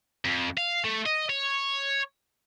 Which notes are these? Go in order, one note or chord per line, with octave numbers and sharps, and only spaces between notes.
F2
F5
A3
D#5
C#5